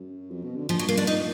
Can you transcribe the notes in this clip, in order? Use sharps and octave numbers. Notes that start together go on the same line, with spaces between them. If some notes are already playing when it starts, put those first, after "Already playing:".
Already playing: F#2
F2
B2
D3
A#2 F3
F#3
A#3
D4
D#4